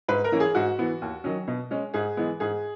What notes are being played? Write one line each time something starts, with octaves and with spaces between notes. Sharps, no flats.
G#2 B4
A#4
E3 A#3 C#4
G#4
G#2 F#4
E3 B3
D#2
D#3 F#3 C#4
B2
G#3 C#4
G#2 G#4
E3 G#3 B3
G#2 G#4